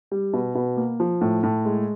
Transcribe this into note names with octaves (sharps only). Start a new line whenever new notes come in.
G3
B2
B2
A#3
F3
A2
A2
G#3